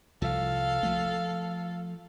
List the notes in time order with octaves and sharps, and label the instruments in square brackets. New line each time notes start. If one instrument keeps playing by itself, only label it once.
[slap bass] C2 F3 [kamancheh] A4 F5
[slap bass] F3 A3